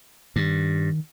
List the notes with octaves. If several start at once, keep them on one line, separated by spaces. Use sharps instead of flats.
G2 D#3